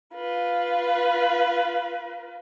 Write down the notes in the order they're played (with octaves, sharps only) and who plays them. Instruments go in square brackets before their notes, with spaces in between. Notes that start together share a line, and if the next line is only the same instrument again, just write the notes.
[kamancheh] F4 B4